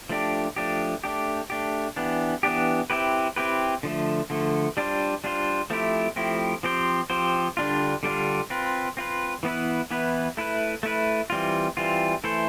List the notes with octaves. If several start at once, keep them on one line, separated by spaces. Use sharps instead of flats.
F3 A3 D4 G4
F3 A3 D4 G4
A3 D4 G4
A3 D4 G4
E3 B3 D4 G4
E3 B3 D4 G4
C4 E4 G4 B4
C4 E4 G4 B4
D3 F3 A3
D3 F3 A3
G3 D4 F4 C5
G3 D4 F4 C5
F3 A3 C4 E4 G4
F3 A3 C4 E4 G4
F3 C4 G4 C5
F3 C4 G4 C5
D3 G3 D4 F4
D3 G3 D4 F4
C4 F4 B4
C4 F4 B4
E3 B3 E4 B4
E3 B3 E4 B4
A3 E4 B4
A3 E4 B4
E3 G3 C4 F4
E3 G3 C4 F4
E3 A3 E4 A4 C5